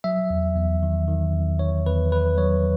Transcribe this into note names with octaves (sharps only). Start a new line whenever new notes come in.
F#3 E5
E2
E2
D#3
D#3
E2
D#3 C#5
E2 B4
D#3 B4
F#3 C#5